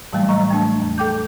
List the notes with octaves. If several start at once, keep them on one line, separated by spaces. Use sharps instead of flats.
A2 E3 F#3 G3 A3 A#3
D#5 A#5 C#6
A3 D4 A5
E2
A4 G5 D6 G6